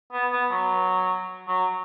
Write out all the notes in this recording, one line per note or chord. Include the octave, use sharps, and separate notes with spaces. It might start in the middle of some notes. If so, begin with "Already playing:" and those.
B3
B3
F#3
F#3